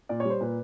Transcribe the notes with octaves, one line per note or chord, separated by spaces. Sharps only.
A#2 D5
C#5
G3 C5
A#2 B4